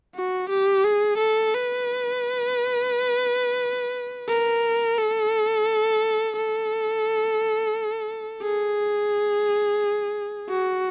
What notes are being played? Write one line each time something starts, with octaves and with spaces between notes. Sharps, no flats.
F#4
G4
G#4
A4
B4
A#4
A4
A4
G#4
F#4